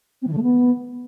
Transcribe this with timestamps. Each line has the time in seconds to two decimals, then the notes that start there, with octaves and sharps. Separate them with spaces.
0.21 C4
0.27 E3
0.32 D3
0.37 A3
0.42 B3